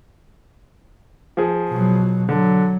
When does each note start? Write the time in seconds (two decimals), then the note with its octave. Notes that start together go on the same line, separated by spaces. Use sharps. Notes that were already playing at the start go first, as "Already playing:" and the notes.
1.37 F3 G#4
1.70 B2 F#3
2.29 D3 F#3